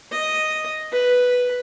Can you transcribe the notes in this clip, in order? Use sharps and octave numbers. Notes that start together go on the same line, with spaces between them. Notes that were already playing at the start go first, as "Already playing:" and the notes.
D#5
B4